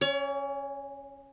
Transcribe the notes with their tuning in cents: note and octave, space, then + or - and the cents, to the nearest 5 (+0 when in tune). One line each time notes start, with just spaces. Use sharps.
C#4 -10 C#5 +35